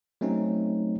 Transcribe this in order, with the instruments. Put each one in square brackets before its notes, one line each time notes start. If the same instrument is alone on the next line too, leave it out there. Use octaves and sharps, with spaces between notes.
[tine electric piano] F#3 A3 C4 C#4 D#4